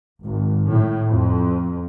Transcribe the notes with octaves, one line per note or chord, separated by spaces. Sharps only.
G#1
A2
F2